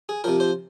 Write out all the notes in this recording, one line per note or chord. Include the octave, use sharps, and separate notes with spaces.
G#4
C3 F3 A#4
C5